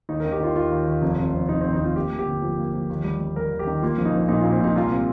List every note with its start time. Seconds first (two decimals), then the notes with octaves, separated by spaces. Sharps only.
0.09 D#2 D#4
0.20 D#3 A#4
0.32 G4
0.40 D#3 F4
0.55 D#2 F4
0.72 D#2
0.87 D#2
1.02 F1
1.18 F1
1.34 F1
1.49 F1 D#4
1.61 D#2 C4
1.73 D#4
1.80 F1 F4
1.95 A#3 G4
2.11 A#3
2.19 G4
2.26 G1
2.42 F3
2.58 A#3
2.73 F3
2.90 D#2
3.04 G3
3.20 G3
3.36 G3 A#4
3.51 D#2
3.59 G4
3.67 D#3
3.82 A#3 F4
3.98 A#1
4.05 D#4
4.14 A#1
4.29 A#2 D#4
4.40 A#2 F4
4.52 C4
4.60 A#2 D#4
4.76 C2 F4
4.92 C3